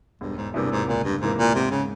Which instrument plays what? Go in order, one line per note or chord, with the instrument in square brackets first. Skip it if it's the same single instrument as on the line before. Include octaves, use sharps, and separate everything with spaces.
[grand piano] E1 [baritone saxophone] G2
[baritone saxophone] G#2
[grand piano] E2 C3 E3 A#3 [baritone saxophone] G2
[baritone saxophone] G#2
[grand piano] C#2 [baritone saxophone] A#2
[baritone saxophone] G2
[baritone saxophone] G#2 [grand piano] C3 E3 A#3
[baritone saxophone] A#2
[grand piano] G#2 [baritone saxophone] C3
[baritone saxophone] C#3